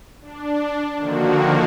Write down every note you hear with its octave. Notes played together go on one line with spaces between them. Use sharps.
D4
D3 D#3 F3 A#3 F#4